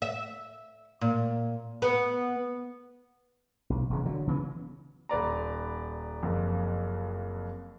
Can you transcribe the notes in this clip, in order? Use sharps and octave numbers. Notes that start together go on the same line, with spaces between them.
E5
A#2
B3
B1
E1 C#3
D3 F#3
C#3 E3 B3
D#1 B4 D5 A#5
F#1 F2